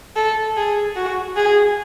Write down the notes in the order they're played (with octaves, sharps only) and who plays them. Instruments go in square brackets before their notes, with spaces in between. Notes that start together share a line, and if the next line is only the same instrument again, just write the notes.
[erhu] A4
G#4
F#4
G#4